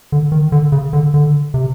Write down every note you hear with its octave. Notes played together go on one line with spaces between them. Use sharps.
D3
D#3
D3
C#3
D3
D3
C3